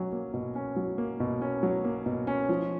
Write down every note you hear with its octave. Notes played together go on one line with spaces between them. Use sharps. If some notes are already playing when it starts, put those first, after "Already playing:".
Already playing: B2 F#3 C#4
A#3
B2
C#4
F#3
A#3
B2
C#4
F#3
A#3
B2
C#4
F3